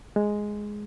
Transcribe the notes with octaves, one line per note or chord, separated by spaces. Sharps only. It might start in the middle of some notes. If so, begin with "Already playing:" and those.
G#3